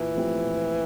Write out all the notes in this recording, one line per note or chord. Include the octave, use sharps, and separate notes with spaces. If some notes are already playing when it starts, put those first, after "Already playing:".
Already playing: A#2 E3
F3 A3 C4 G4
A#2